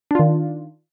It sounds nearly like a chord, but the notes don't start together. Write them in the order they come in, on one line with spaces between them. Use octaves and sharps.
D4 F4 D#3